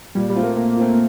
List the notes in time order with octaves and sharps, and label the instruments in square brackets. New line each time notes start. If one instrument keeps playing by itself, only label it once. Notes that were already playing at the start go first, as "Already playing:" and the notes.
[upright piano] A#2 [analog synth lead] G3
[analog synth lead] G3
[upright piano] A3 C4 F4
[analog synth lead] A#3
[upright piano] A#2 [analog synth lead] A#3
[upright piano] A3 C4 F4